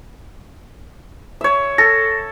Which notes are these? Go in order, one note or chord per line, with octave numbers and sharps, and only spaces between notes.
C#5 E5
A4 A#6